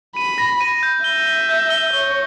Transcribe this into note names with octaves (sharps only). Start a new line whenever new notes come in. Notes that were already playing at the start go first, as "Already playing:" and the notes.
B5 D#7
A#6
D#7
G6
E5 G7
G7
G6
G7
C#5 G7